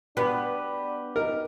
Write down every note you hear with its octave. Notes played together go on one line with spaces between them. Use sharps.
B3 D4 G4 B4
D#4 A#4